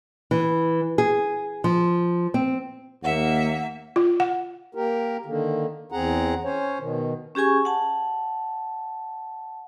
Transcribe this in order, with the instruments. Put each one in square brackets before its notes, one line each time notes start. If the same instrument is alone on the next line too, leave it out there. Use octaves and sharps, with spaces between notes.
[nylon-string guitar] E3
G#4
F3
C4
[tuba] D#2 [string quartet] A#3 E5 [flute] F#5
[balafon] F4
F#5
[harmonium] A#3 G4 A#4
D3 D#3 A#3
E2 C4 G#4 F#5 A#5
C#4 C5 C#5
B2 D#3
[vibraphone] C#4 G4 G#4 G#5 C#6
F#5 A5